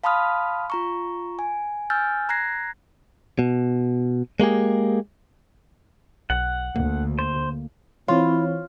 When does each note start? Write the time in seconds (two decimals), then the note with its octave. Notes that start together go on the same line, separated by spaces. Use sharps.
0.04 F5 A5 B5 C6 D#6 F6
0.70 F4 A#5 C#6
1.39 G#5
1.90 G#5 E6 F6 G6 A6
2.29 A#5 F#6 G#6 A#6 C7
3.39 B2
4.40 G#3 A#3 G4 G#4
6.30 B1 F#5
6.76 D2 A#3
7.19 C5
8.08 E3 C4 E4 F4 C#5